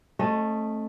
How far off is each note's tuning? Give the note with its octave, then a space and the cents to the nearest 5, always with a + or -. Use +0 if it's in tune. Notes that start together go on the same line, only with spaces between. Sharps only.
A3 +0 C#4 -40 D#5 +0